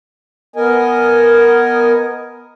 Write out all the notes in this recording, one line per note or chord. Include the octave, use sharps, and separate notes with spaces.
B3 A#4 D#5 G#5